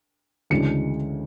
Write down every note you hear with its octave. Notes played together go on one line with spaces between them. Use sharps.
D2 C#3 E3 G#3 D4 C#7